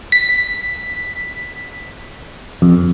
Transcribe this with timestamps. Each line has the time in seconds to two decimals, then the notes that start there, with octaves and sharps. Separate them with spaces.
0.12 B6
2.62 F2